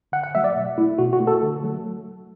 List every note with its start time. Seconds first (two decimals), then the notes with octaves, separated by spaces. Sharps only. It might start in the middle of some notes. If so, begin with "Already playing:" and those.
0.12 D3 F#5
0.24 F#5
0.35 F#3 A3 E5
0.44 D5
0.56 B2
0.78 A3 E4
0.98 B2 F#4
1.13 F#4
1.20 A3
1.27 A4
1.42 D3
1.63 F#3 A3